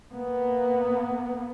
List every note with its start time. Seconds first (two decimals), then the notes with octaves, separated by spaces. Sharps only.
0.13 A#3 B3